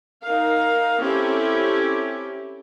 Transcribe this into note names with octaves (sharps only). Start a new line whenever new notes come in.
D#4 A#4 F5
C4 C#4 E4 G4 A4